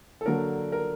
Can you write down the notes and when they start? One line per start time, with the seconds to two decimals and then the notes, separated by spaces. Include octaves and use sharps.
0.21 A4
0.26 D3 F#3 A#3 D4 A#4
0.72 A#4